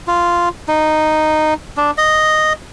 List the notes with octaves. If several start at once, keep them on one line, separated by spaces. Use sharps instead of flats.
F4
D#4
D4
D#5